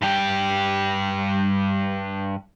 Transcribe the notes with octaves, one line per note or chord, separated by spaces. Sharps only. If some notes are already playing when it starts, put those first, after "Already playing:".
G2 G4